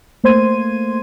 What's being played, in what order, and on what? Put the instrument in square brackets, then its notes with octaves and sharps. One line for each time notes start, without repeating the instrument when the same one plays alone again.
[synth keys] A3 A#3 C5 C6 G#6 D#7